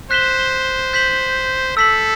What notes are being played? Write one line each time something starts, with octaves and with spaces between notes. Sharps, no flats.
C5 F#6 B6 E7 G7
G6 B6 F#7
A4 E6 B6 F#7